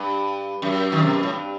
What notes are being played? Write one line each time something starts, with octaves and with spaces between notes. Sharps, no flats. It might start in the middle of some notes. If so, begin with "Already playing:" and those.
Already playing: G2
F#2
D#3
C3
B2
A2
G2